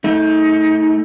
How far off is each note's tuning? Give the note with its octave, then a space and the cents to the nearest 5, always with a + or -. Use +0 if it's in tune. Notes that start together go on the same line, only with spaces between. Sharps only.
A3 +0 D#4 +30